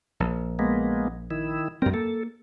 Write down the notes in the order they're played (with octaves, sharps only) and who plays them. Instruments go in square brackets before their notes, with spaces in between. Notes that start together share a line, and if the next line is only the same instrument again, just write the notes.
[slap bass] A#1
[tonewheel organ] G#3 A#3 B3
D#3 E4
[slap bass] F#2 C4 [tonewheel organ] G3 A#4
[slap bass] A#3 [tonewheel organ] A4